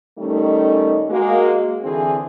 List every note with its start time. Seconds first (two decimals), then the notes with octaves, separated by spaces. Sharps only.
0.18 D#3 G3 A3 C#4 D#4
1.10 G#3 A#3 F#4
1.83 D3 E3 C4 E4 G#4